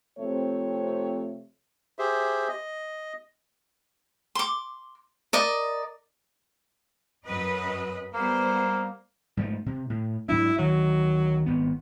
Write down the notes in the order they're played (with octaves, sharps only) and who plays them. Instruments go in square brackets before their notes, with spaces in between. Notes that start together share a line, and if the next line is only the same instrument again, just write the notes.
[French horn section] C3 F3 A3 C4 C#5
[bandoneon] G4 G#4 C5 E5
D#5
[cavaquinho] C6 D6
A#4 D5 D#5
[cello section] F#2 B4 D#5
[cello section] G3 B3 C5 [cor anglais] A#3
[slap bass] G#2 F3 A3
C3
A2
[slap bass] G#2 F#3 D4 [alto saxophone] E4
[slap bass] D2 D#3 [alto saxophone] F#3
[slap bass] G#1 B3